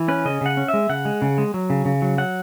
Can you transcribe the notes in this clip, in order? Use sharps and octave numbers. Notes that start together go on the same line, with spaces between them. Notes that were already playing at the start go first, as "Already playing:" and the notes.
Already playing: E3
C#4 B4
C#3 D#5
C#3 F#5
C#4
E5
G#3
C#3 F#5
G#3
C#3
G#3
F#3
C#3
C#3
F#3
F#3 F#5